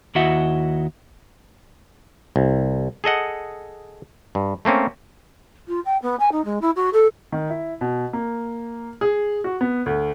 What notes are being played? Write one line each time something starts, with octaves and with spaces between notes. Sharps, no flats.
D#2 E4 F#4 D#5 E5 F#5
C2
G#4 A4 D#5 F#5
G2
A3 A#3 C4 C#4
F4
G5
B3
G#5
D#4
G#3
E4
F#4
A4
D#3
E4
B2
A#3
G#4
F#4
B3
D2